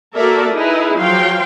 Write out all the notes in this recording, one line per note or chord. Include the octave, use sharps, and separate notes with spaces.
A#3 F#4 A4 A#4 D5 E5
D#4 E4 G#4 B4
F3 F#3 F5 G5 C6